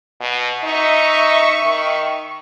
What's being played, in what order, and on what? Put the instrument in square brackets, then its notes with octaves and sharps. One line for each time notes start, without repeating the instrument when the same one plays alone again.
[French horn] B2
[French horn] D#4 [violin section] E5 C#6
[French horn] D#3